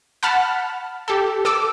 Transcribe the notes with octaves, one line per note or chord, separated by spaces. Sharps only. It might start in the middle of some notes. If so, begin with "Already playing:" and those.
F#5 A5 B5 F6
G4 A4
A4 D6 E6